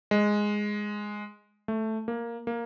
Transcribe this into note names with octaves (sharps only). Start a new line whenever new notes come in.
G#3
A3
A#3
A#3